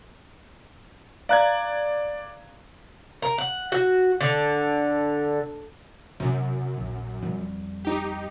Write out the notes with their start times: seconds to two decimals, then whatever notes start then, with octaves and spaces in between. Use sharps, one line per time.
1.29 D5 F5 A#5 F#6 G#6
3.22 A#4
3.38 F#5
3.72 F#4
4.21 D3
6.20 F#2 C3 C#4
6.78 A#1 D#2
7.23 F2 G3
7.85 D#4 G4